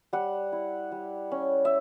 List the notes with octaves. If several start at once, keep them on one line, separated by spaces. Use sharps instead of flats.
G3 F#5
E4
G3
C#4
E5